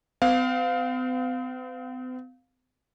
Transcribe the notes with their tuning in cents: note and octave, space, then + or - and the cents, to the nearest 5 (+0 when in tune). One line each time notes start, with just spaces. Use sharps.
C4 -45 F5 +15